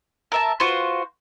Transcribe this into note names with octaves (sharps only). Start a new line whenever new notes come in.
A#4 E5 A5
F4 F#4 B4 C5